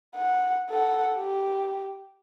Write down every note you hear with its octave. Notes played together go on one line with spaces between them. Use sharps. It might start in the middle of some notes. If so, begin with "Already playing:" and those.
F#5
A4 F#5
G4